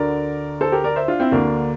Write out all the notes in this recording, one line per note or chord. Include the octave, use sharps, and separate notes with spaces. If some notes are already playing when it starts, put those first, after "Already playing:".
Already playing: D2 D3 A#4 D5
A4 C5
G4 A#4
A#4 D5
C5 E5
D4 F4
C4 E4
D2 D3 A#3 D4